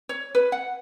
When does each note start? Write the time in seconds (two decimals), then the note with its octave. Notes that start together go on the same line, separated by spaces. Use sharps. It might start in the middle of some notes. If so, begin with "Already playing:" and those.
0.09 C#5
0.35 B4
0.52 F#5